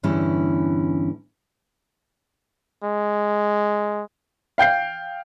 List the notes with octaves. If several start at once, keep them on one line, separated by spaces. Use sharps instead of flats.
E2 G2 D3 E3 C#4 E4
G#3
F5 G5 G6 C7